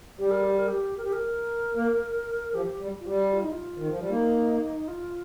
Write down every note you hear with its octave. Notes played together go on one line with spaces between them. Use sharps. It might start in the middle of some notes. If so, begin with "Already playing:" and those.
G3 G4
A#4
G4
A#4
G4
A#4
G4
A#4
A#3
F3 G4
G3
F4
G3 G4
F4
D#4
F4
D#3
F3
G3
A#3 D#4
F4